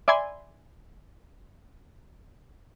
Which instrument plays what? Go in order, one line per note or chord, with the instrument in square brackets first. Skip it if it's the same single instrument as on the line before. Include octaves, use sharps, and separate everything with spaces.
[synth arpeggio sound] D5 E5 G#5 B5 C6 G#6